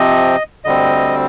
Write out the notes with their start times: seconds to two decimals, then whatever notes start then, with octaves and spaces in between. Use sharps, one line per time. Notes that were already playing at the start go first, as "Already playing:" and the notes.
Already playing: C3 F3 C4 D#5
0.65 D2 D3 G3 C4 D#5